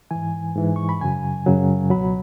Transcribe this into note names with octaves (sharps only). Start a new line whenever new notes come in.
G#2 E3 G#5
G#2 E3
C#6
B5
F#2 C#3 F#3 G#5
F#2 C#3 F#3
C#2 B2 F#3 B5